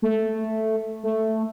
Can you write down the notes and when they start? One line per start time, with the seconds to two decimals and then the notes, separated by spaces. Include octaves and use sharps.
0.02 A3
1.03 A3